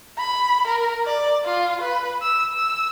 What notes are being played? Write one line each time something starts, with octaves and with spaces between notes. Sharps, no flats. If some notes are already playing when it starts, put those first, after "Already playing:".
B5
A#4
D5
F4
B4
E6
E6